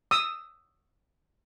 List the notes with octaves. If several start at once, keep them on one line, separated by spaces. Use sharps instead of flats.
D#6 E6